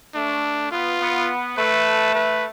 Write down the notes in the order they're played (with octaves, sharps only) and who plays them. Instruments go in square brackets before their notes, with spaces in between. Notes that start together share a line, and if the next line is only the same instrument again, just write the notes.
[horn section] A3 [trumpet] D4
[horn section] B3 [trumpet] F4
[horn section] B3
[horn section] A3 [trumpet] B4
[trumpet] B4